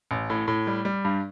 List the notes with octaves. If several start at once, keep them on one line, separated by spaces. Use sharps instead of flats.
A1
A2
A2
G3
G3
G2